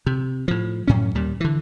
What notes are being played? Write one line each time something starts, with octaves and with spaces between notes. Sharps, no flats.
C3
A2 F3
F#2 A2 C#4
D#2 A#2 G3
D3 E3